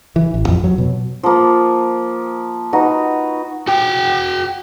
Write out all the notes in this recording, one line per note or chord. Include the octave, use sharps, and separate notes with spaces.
E3
A1
F2
F#3
B2
F3 A#3
D#4 F#4 B4
F#4 G5